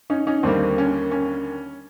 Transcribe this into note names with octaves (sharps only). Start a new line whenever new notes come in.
C#4 D#4
C#4 D#4
D#2 D3 G3 A#3 C4 D4
C#4
C#4